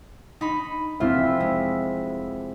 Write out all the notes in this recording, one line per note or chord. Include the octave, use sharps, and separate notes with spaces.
D#4 B5
F1 C4 E4 F4 E5
G#3